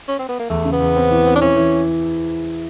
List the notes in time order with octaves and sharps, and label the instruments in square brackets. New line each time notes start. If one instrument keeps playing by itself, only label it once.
[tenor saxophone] C#4
C4
B3
A#3
[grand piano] E2 [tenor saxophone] A3
[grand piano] C#3
[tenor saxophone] B3
[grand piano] E2
C4
E3
C4
[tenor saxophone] D4
[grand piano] E3 [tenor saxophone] C#4
[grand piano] E3